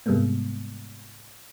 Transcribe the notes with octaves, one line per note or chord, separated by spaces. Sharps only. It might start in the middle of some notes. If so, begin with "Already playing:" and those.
G#2 C3 G3 G#3 A#3 B3